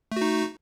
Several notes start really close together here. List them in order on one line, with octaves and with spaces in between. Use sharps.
A3 F#4 D#4